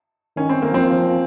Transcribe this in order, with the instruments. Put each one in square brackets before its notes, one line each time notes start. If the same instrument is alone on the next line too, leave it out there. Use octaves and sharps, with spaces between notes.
[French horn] D#3 [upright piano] C#4
[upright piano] C4
A#3
[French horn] F3 [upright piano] C4